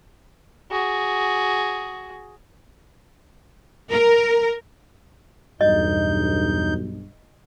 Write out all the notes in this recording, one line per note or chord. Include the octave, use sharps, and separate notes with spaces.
F#4 G#4
A#4
B1 E2 G2 D#4 D#5 G6